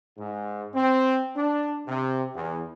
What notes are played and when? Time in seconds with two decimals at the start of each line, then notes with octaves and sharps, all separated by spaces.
0.18 G#2
0.74 C4
1.35 D4
1.86 C3
2.34 E2